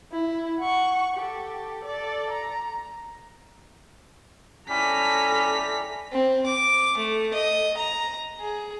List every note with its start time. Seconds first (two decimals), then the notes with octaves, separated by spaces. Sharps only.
0.12 E4
0.60 F#5 C#6
1.16 G4 A4
1.84 A4 D5
2.30 A#5
4.69 C#4 E4 A4 D5 G5 A#5 B6
6.12 C4
6.46 D6
6.97 A3
7.34 D#5
7.77 A#5
8.40 G#4